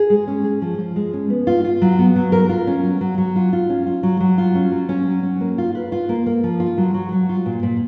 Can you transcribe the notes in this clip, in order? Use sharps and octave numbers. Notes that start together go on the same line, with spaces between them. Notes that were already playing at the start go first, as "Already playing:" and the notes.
Already playing: G#4
G#3
C#4
G#4
F3
F3
G#3
C#4
B3
F4
F4
F#3
B3
F#3
A#4
F4
C#4
F#3
F#3
F#3
F4
F4
C#4
F4
F#3
F#3
F4
C#4
F#3
C#4
F#3
C#4
A#3
F4
B4
F4
A#3
A#3
F3
F4
F#3
F#3
F#3
F4
A#2
A#2